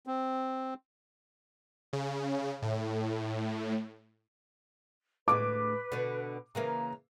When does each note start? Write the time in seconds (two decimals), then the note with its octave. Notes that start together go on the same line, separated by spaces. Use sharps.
0.07 C4
1.93 C#3
2.62 A2
5.28 D2 A2 G#3 B4 D6
5.92 B2 D3
6.55 C#3 E3 A#3 A#5